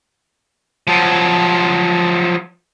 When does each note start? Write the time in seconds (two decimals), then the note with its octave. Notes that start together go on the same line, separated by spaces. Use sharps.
0.87 F3 F#3